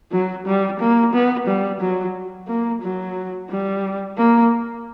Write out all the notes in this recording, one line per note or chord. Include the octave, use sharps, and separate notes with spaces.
F#3
G3
A#3
B3
G3
F#3
A#3
F#3
G3
A#3